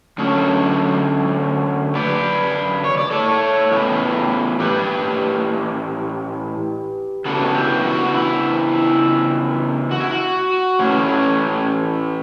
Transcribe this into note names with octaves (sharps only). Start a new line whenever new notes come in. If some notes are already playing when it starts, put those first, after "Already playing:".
D3 F#3 A3 C#4
B4 D5
C#5
D5
A4 C#5
A2 E3 B3 E4
G4 B4
C#3 E3 B3 D4 F#4 A4
E4 G4
F#4
E4
F#4
E4
F#4
A2 E3 A3 C#4